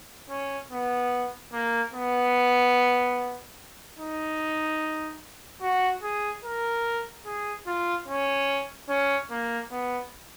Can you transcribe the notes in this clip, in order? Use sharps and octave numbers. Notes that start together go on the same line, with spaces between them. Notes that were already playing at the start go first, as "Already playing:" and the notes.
C#4
B3
A#3
B3
D#4
F#4
G#4
A#4
G#4
F4
C#4
C#4
A#3
B3